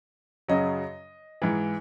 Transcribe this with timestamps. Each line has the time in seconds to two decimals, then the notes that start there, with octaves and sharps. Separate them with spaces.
0.48 F#2 C#3 F#3 D#5
1.42 G#2 E3